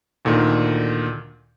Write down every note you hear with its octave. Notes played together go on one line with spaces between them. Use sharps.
D2 A#2 D3 D#3